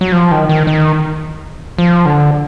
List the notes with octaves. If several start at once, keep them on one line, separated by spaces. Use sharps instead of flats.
F#3
F3
D#3
D#3
D#3
F3
D3